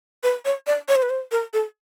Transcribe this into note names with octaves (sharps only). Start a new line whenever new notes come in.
B4
C#5
D5
C#5
C5
B4
C5
A#4
A4